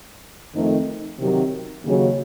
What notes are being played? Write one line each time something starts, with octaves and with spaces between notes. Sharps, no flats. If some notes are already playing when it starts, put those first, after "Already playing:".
F2 D#3 A3 C4 D#4
C3 D#3 F#3
D#2 C#3 F#3